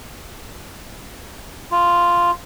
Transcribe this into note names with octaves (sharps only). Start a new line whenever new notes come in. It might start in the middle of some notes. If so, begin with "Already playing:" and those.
F4